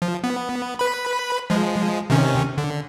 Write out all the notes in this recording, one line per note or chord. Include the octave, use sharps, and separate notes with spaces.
F3
B3
B4 B5
F3 G#3
C3 D#3 C#4
D3